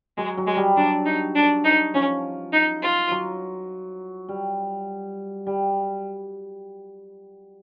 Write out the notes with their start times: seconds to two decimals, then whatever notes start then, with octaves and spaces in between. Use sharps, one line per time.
0.17 F#3 G#3
0.37 F#3
0.47 G#3
0.56 G3
0.76 F#3 D4
1.06 D#4
1.35 D4
1.64 D#4
1.94 F3 C#4
2.53 D#4
2.83 F4
3.11 F#3
4.29 G3
5.47 G3